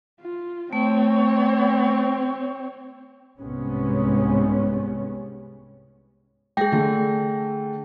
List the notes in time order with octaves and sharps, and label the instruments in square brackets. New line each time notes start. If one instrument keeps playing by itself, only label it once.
[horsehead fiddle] F4
[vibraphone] A3 [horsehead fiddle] C4 C#5
[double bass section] C2 G#2 C3 G#3 B3 C#4
[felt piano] G#3 A#6 [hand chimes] G#4 G5
[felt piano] D3 A3